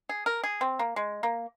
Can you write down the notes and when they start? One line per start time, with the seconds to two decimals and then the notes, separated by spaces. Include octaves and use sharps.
0.09 G#4
0.26 A#4
0.44 G#4
0.61 C4
0.79 A#3
0.96 G#3
1.23 A#3